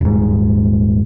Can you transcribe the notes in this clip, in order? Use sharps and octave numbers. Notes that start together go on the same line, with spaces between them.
D#1 G#2